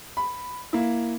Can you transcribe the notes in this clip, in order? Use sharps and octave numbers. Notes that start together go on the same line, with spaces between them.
B5
A#3 E4